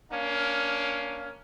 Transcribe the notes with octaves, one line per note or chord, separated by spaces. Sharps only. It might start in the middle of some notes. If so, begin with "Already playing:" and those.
A#3 C#4 D4 F5